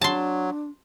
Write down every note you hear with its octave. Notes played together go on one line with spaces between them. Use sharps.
F#3 D4 A5 C6